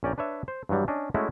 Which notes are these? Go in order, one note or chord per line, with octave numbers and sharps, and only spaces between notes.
A#1 C#4 D5 G5 A#5
D4 B4 C#5 E5
C5
G2 E3 F#3 G3
C#4 D4 D#5
G#3 A3 C#4 E4 F#4